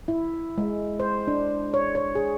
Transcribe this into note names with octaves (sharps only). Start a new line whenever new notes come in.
E4
G#3
C5
D4
C#5
C#5
G#4